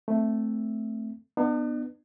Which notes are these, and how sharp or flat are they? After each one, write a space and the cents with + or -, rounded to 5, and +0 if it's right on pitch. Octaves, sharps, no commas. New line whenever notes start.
A3 +0 C4 +0
B3 +0 D4 +45